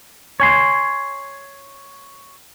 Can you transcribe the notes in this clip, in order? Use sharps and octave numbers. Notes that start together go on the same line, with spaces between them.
C#5 G#5 C6